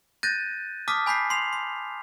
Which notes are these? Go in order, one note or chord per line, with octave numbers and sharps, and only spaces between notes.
F#6 G6 A6 A#6 D#7
A5 D6 D#6 F6 B6
G#5 B5 G6 B6 C7
C6 C7 F7
C6